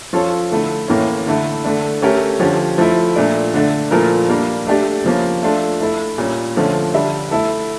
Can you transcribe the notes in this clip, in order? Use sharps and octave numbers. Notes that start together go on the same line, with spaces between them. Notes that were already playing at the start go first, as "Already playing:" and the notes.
F3 C#4 F4 A4 C#5
D3 A3 E4
A2 E3 A#3 C#4
D3 A3 E4
D3 A3 D4
A3 C#4 G4 A#4
D3 F3 C#4 G4
F3 A3 E4
A#2 A3 D4
D3 A3 D4
A#2 F3 A3 E4 A#4
G3 A#3 D4
A3 D4 G4 D5
C#3 F3 A#3 C#4
A3 D4 F4 A4
A3 E4 A4
A#2 G3 C#4
D3 F3 A3 C#4
D3 G3 D4 A4 E5
A3 E4 A4